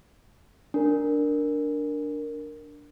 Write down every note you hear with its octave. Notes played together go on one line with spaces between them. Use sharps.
D4 A#4